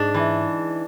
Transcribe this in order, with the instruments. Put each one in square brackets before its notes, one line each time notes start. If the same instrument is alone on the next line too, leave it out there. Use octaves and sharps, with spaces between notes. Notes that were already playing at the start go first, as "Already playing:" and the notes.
Already playing: [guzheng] G#2 D4
E3